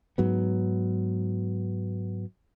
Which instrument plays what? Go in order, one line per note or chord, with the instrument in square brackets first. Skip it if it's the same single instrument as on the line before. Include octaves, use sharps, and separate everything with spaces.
[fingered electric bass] G#2 F#3 B3